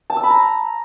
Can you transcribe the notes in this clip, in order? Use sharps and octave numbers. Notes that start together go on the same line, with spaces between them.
A5
E6
B5
A#5